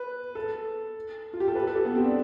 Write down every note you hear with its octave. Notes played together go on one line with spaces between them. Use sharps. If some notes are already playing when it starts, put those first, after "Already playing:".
Already playing: B4
A4
F4
G4
A4
B4
A4
G4
B3
C4
D4